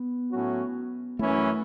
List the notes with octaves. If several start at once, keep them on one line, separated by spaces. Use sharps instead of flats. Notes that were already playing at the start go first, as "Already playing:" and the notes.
Already playing: B3
A2 F#3 C#4 F#4
F#2 E3 A3 C#4 E4